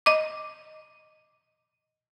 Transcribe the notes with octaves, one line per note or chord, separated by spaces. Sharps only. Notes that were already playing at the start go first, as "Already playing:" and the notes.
D#5 D6